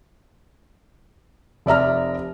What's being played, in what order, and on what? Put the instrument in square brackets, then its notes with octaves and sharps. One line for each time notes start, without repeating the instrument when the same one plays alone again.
[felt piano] F1 D5 E5 A#5 F6